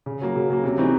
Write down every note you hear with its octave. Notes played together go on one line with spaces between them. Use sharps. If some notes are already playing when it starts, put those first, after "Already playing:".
C#3
F#3 A#3
C#3
F#3 A#3
C3
E3 A3 C4 D#4